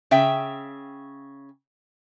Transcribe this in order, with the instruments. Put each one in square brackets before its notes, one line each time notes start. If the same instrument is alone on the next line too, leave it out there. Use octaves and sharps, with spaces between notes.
[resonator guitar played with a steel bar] C#3 E5 G5